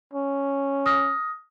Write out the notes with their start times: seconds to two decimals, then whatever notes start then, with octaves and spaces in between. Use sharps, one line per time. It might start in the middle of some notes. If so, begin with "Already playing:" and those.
0.13 C#4
0.86 D#6 F6 A#6